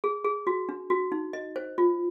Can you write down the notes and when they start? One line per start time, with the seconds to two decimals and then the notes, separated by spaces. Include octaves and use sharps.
0.04 G#4
0.25 G#4
0.47 F#4
0.69 D4
0.90 F#4
1.12 D#4
1.33 D#5
1.56 C5
1.78 F4